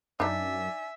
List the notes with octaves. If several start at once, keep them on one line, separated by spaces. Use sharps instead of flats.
F#2 D4 D#4 D5 E5 G#5